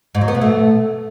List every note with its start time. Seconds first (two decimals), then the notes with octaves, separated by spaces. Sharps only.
0.15 G#2
0.21 F#3
0.28 B3
0.35 B2
0.41 A3